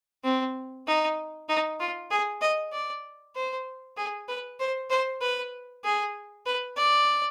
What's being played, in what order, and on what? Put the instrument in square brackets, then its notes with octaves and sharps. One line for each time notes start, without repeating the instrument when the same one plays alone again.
[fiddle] C4
D#4
D#4
F4
G#4
D#5
D5
C5
G#4
B4
C5
C5
B4
G#4
B4
D5